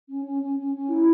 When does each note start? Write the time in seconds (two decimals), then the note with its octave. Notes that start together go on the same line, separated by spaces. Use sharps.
0.08 C#4
0.25 C#4
0.41 C#4
0.58 C#4
0.74 C#4
0.90 E4